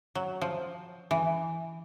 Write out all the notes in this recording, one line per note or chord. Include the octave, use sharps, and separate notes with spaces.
F#3
F3
E3